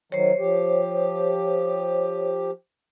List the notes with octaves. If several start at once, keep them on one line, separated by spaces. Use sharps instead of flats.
D#3 F#3 C5 C#5
F3 G4